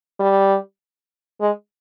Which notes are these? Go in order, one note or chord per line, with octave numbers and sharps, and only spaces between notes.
G3
G#3